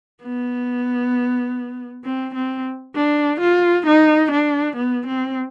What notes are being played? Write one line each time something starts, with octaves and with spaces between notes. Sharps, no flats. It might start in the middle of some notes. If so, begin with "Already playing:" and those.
B3
C4
C4
D4
F4
D#4
D4
B3
C4